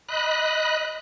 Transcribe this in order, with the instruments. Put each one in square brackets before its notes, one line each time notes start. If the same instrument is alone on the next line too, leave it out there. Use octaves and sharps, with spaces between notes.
[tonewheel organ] D#5 B5 F#6